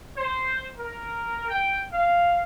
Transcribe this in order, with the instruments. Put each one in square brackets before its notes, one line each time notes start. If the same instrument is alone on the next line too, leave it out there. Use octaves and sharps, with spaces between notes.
[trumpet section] C5
A#4
G5
F5